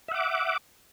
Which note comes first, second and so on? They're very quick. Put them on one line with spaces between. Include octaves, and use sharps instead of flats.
E5 F#5 D6